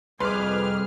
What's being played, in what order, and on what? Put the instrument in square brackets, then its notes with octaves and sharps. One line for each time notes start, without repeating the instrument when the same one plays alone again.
[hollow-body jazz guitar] C2 C6 [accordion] F2 F6 [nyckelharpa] G#4 [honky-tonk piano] B4 D6